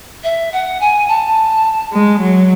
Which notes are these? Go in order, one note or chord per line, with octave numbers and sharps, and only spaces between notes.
E5
F#5
G#5
A5
G#3
F#3